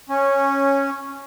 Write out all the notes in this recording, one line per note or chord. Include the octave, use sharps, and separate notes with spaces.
C#4